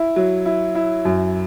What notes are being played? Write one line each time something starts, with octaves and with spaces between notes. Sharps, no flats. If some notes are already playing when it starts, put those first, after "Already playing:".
Already playing: E4
F#3
E4
E4
F#2